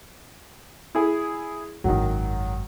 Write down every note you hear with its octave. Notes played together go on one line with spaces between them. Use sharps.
E4 G#4 B5
G#1 F#2 D#3 F#3